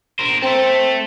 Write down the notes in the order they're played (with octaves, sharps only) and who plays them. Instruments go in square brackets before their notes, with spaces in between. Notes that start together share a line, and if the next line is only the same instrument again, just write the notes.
[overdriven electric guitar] A#4 C5
[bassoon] C4 [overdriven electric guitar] A4 E5